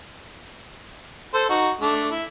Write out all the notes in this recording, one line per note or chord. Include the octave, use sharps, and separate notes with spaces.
A4 C5
D#4 F#4
A3 D4
E4